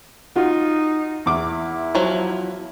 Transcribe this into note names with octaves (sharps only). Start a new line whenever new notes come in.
D#4 F4 F#4
E2 E4 D6
F3 F#3